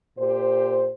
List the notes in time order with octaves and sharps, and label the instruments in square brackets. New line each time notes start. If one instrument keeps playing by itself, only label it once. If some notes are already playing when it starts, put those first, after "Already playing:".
[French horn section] A#2 G4 C5